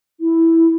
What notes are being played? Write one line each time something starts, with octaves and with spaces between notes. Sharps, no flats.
E4